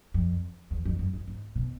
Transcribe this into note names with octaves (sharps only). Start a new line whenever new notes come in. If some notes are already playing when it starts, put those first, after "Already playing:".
F2
E2
F2
F#2
G#2
G#2
B2